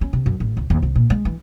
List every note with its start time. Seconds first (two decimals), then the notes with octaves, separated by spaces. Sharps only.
0.01 C#4
0.13 C3
0.26 F#2
0.40 A1
0.57 C#2
0.70 D#2
0.82 C2
0.95 A#2
1.10 G#3
1.25 E3